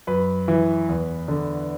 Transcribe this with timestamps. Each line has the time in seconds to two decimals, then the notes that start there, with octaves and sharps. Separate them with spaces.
0.07 F#2 B4
0.48 E3
0.89 E2
1.28 D3